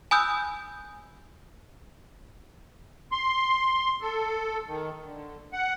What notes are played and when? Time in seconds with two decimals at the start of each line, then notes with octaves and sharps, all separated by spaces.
0.11 G#5 B5 D#6 E6 F#6 G6
3.12 C6
4.01 A4
4.68 D#3
5.04 D3
5.53 F#5